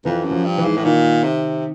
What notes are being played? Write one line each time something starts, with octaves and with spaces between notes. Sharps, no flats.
F2 E3
F#2
F3
G2
E3
G#2
A2
A#2 D#3
C3